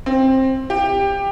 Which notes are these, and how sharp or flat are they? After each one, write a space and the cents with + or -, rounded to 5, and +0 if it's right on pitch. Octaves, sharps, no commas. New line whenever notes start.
C4 +15
G4 +15